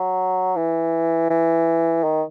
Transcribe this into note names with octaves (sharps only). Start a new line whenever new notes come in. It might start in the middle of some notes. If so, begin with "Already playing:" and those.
Already playing: F#3
E3
E3
D#3